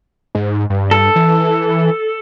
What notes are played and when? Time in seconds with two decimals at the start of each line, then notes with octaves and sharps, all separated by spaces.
0.35 G#2
0.70 G2
0.91 A4
1.15 E3